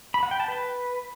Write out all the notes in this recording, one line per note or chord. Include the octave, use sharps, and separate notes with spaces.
B5
F#5
G5
A5
B4